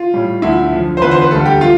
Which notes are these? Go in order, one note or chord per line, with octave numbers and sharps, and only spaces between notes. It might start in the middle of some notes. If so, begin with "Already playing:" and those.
Already playing: F4
A2 G3
D2 D3 F3 E4
F2 D3 F3
C5
E2 D3 F3 B4
C5
B4
D2 D3 G3 A4
G4
F3 F4